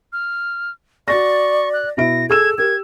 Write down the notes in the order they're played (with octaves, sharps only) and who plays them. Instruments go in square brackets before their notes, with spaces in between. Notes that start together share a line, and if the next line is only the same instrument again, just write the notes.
[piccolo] F6
[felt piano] F#4 A6 A#6 [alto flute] D5 [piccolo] C#6
[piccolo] F#6
[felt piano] B2 E4 D7 [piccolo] A#6
[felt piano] G#4 E6 E7 [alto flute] A4 [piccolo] G#6
[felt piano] G4 [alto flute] A#4 [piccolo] G#6